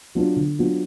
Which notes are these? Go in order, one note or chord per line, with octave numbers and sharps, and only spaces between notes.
F#3 B3 D4 F4
D3
F#3 B3 D4 F4